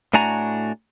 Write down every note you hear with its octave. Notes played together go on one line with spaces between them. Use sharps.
A2 A3 D4 F#4 G#5 A#5